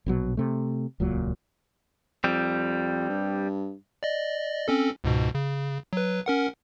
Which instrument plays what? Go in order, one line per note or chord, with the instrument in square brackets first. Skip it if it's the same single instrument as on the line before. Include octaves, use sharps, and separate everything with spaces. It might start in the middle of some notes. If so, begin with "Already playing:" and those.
[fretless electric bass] A#1 B2 F#3
C3 A3
D#1 C#2 A#2 F#3
[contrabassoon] F2 [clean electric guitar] G3 C4
[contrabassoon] G2
[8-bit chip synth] D5 D#5
C4 C#4 A4
C#2 G#2 B2
C#3
F#3 B4
C#4 A#4 F#5